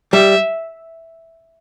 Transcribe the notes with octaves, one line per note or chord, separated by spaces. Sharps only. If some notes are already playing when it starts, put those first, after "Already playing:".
G3 E5